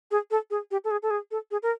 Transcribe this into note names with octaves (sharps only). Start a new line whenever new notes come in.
G#4
A4
G#4
G4
A4
G#4
A4
G#4
A4
G#4
A#4